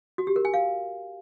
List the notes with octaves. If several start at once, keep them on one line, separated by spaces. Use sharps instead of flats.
F#4
G4
A#4
G#5
F5